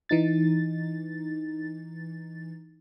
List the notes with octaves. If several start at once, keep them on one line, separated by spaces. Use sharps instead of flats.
E3 D#4 A6